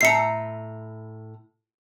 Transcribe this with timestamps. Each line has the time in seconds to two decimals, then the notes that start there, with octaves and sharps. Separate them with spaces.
0.01 A2 E5 A#5 C7 C#7